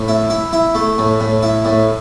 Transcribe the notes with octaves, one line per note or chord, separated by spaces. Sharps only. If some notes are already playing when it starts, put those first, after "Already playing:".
Already playing: A2
E4
E4
E4
A3
A2
A2
E4
A2